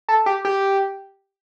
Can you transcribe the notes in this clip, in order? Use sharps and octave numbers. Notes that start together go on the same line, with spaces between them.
A4
G4
G4